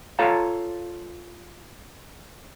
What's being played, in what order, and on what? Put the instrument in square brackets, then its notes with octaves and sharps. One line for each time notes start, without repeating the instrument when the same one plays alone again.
[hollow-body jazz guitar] F4 A4 C#5 F5 A5 A#5